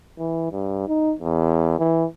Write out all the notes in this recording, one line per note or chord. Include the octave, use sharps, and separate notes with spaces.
E3
G2
D#4
E2
E3